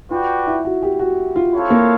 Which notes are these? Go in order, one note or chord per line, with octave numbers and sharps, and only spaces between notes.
F4 F#4 B4 D5 G5
E4
F#4
G4
F#4
F4
C4 E4 A4 C#5 F5
A#3